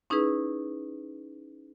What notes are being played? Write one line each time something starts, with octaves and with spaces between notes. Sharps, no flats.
C#4 D#4 E4 G#4 B4